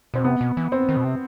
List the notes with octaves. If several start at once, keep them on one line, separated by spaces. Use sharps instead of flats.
B2 C4
C3 B3
B2
E3
C4
D#3
B2
C3